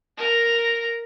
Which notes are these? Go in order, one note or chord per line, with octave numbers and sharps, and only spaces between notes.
A#4 A#5